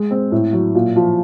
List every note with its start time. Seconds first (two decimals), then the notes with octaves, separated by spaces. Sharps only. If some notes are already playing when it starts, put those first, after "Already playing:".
Already playing: G#3
0.11 C4
0.32 A2
0.53 F#3
0.75 A#2
0.96 F3